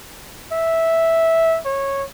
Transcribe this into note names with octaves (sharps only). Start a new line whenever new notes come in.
E5
C#5